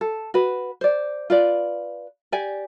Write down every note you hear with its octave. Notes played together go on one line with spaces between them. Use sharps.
A4
F#4 B4
C5 D5
F4 B4 D5
G4 D5 G#5